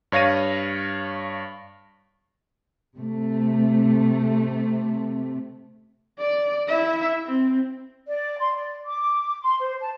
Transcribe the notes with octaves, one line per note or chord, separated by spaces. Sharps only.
G2 C#5 F5 A#6 D#7
C3 A3
D5
E4 E5
C4
D5
C6
D5
D6
C6
C5
A5